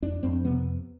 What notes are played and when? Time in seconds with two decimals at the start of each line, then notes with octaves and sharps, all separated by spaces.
0.02 F2 D4
0.23 F2 C4
0.45 C3 B3